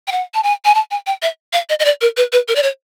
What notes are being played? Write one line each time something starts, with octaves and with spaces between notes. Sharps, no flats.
G5
F#5
A5
G#5
G#5
A5
G#5
G5
E5
F5
D#5
D#5
D5
A#4
B4
B4
A#4
D5
C#5